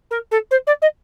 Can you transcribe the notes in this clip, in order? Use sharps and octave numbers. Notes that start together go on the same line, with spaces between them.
A#4
A4
C5
D5
D#5